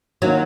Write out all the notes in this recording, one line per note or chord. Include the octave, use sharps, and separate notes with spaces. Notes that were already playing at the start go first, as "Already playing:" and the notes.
D#3 F#3 A#3 F4